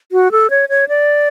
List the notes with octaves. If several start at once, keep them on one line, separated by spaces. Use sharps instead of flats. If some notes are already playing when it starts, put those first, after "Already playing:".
F#4
A4
C#5
C#5
D5